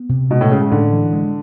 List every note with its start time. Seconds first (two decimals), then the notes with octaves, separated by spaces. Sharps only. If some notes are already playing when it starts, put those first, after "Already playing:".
Already playing: B3
0.09 C3
0.30 B2 G#3
0.41 A2
0.51 C#3 G#3
0.62 C#3
0.71 A2 D3
0.92 E3
1.13 G#3